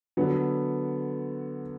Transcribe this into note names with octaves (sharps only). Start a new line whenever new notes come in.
D3 F#3 B3